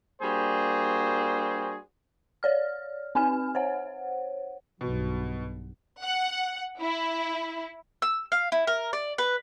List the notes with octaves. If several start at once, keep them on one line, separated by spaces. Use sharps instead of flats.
G3 A#3 D4 F#4 G#4 C5
C#5 D5 F6
C4 D#4 B4 G#5 F6
C5 C#5 F#5
B1 G2 B2
F#5
E4
E6
F5
E4
A#4
D5
B4